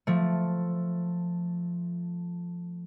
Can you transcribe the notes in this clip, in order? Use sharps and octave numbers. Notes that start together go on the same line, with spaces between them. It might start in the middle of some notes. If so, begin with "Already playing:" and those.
F3 A3